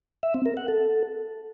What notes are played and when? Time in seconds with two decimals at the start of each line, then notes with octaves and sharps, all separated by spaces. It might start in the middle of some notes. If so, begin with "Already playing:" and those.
0.23 E5
0.34 C4
0.46 A#4
0.57 F#5
0.68 A4